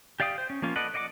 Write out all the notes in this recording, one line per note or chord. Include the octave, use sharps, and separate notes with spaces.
G4 D5 F5 G5 D#6
C5
C#4
F3 A#3 C#4 F4
A4 B4 D5 D#5 F#5
D5 D#5 F#5 C6 D6